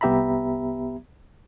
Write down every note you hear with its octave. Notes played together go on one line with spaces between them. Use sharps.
C2 B3 G4 E5 A#5 B5